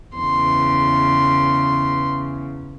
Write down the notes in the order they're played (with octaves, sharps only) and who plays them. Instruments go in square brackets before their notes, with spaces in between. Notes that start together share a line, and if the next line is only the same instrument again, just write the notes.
[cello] E2 C#3 [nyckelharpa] C6